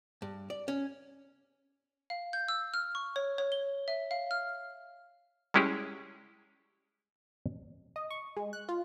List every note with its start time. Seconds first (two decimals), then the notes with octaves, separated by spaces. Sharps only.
0.22 G2
0.50 D5
0.68 C#4
2.10 F5
2.33 G6
2.48 E6
2.74 F6
2.95 C#6
3.16 C#5
3.38 C#5
3.52 G7
3.88 E5
4.11 F5
4.31 F6
5.54 G3 G#3 C#4 E4 G4 G#4
7.96 D#5
8.11 C#6
8.37 G#3
8.53 F#6
8.69 F4